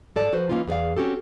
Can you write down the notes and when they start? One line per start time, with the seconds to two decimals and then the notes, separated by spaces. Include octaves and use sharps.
0.16 G#2 A4 D5 A5
0.32 F3 F#4 B4 C5
0.49 E3 A3 A#3 C#4 D#4 F4
0.67 E2 G#4 B4 D5 F5
0.97 C4 C#4 F#4 G4 A4